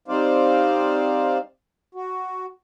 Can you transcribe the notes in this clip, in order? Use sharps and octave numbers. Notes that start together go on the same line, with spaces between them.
G3 C4 D#4 C5 D5 F5
F#4